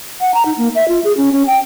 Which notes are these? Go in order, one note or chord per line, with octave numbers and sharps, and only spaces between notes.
F#5
A#5
D#4
A#3
E5
F4
G#4
C#4
C#4
G5